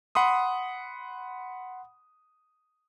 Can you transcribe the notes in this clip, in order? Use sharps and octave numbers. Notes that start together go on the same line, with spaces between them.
F#5 B5 C6 D#6